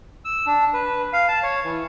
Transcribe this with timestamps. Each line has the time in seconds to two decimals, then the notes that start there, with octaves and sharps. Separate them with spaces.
0.25 E6
0.46 D4
0.74 B4
1.13 F5
1.28 A5
1.43 C#5
1.64 E3